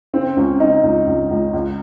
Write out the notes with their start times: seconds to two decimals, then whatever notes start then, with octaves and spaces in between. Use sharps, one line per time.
0.13 C#3 C4
0.37 C#2 C#4
0.60 C#3 D#4
0.83 C#2
1.07 C#2
1.31 C#2
1.53 C#2